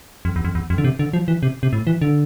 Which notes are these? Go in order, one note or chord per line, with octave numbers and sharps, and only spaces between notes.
F2
E2
F2
E2
F2
D3
C3
D3
F3
E3
C3
C3
A2
E3
D3